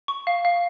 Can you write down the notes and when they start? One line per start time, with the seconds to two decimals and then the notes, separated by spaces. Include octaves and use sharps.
0.08 C#6
0.27 F5
0.45 F5